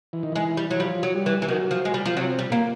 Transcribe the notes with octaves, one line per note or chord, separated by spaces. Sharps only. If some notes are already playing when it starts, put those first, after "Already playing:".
E3
D#3
E3 G#3
G3
E3 F#3
F3 G3
F#3
G3
E3
E3
D#3 F#3
F3
G#3
G3
F3
C3 F#3
G3
A#2 A#3